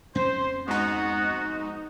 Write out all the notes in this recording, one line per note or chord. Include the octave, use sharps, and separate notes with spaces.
F2 C4 C#4 C5
G#2 B3 D#4 F#4